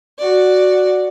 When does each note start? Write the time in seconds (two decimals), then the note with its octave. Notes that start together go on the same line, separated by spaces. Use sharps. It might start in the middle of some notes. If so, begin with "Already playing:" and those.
0.18 F#4 D5